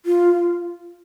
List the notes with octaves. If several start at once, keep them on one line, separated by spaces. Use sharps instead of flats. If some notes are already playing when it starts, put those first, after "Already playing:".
F4